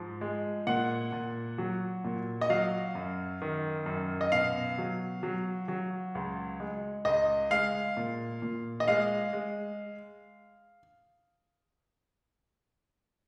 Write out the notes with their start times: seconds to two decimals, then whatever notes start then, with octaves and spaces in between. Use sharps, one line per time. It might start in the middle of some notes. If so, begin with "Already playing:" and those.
Already playing: G#2 F3
0.21 G#3
0.67 A#2 F#5
1.12 A#2
1.58 F#3
2.04 A#2
2.41 D#5
2.49 F#3 F5
2.95 F#2
3.42 D#3
3.86 F#2
4.21 D#5
4.32 B2 F5
4.78 F#3
5.23 F#3
5.68 F#3
6.15 C#2
6.60 G#3
7.05 C#2 D#5
7.51 G#3 F5
7.97 A#2
8.42 A#2
8.80 D#5
8.88 G#3 F5
9.33 G#3